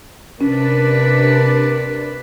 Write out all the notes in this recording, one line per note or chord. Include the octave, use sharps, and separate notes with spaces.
C3 C#4 D4 A#4 B4